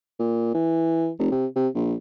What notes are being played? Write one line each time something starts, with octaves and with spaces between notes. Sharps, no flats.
A#2
E3
F1
C3
C3
A#1